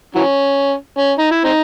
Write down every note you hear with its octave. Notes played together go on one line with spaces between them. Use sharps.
E3 F#3 C#4
C#4
D#4
E4
C4 D#4